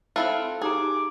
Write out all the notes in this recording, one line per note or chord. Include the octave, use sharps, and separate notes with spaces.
C4 E4 F4 A4 F5 F#6
D#4 G4 G#4 A#5 D6